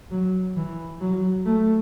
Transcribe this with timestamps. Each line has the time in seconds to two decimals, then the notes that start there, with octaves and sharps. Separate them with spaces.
0.11 F#3
0.56 E3
1.00 F#3
1.46 A3